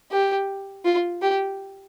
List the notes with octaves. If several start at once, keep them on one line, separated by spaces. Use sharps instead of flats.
G4
F4
G4